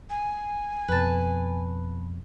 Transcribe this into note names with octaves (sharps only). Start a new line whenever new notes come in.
G#5
F2 B2 B4 A5